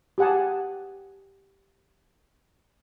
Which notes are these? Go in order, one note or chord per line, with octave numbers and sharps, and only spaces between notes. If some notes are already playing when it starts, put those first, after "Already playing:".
G4 G#4 F#5 G#5 A5